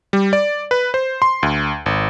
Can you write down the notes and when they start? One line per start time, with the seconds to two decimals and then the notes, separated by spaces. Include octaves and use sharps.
0.13 G3
0.33 D5
0.71 B4
0.94 C5
1.22 C6
1.43 D2
1.86 G#1